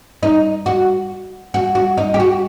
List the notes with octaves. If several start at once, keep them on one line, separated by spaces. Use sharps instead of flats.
D#4
F#4
F#4
F#4
D#4
G4
F#4